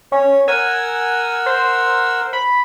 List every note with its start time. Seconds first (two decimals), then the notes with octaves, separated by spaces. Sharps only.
0.12 C#4 C#5
0.48 A#4 F#5 G#5 E6
1.46 C5
2.33 B5